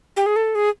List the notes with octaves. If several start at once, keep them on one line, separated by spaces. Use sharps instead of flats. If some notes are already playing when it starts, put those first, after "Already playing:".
G4
G#4
A4
G#4